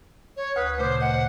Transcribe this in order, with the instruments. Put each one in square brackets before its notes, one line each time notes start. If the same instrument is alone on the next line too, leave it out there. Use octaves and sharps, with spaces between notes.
[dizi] C#5
[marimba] D2 D#6 [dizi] B4
[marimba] A#2 C#3 A3 [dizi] C5
[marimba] D#5 [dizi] F#5